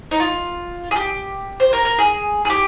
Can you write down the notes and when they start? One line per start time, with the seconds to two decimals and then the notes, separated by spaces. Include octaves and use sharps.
0.11 D#4
0.20 F4
0.91 G#4
0.96 G4
1.60 C5
1.73 A#4
1.85 A#4
1.98 G#4
2.45 G#4
2.50 G4